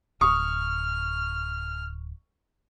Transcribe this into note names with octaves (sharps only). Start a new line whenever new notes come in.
D1 C#6 D#6 F6